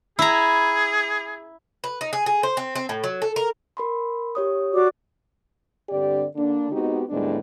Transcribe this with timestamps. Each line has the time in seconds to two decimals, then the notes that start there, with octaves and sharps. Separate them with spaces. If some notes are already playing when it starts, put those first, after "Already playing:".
0.19 E4 G#4 A#5
1.84 B4
2.01 D#4
2.13 G#4
2.26 G#4
2.43 C5
2.57 C4
2.75 C4
2.89 A2
3.04 F#3
3.22 A4
3.36 A#4
3.77 A#4 B5 C6
4.35 G4 C#5 D#6
4.73 F#4 D5 D6
5.89 G2 D3 C4 G4 D5
6.36 D3 A#3 D4
6.71 G#3 B3 C4 D#4 F#4 G4
7.09 D#2 A2 G3 G#3 B3 D4